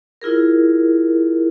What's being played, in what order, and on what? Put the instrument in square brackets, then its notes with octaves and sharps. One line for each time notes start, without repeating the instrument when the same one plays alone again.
[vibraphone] E4 F4 G#4 A#4